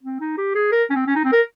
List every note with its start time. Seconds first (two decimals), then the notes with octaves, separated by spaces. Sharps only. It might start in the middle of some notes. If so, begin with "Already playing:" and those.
0.03 C4
0.20 D#4
0.38 G4
0.55 G#4
0.72 A#4
0.90 C#4
0.95 C4
1.07 C#4
1.15 D#4
1.24 C4
1.32 A#4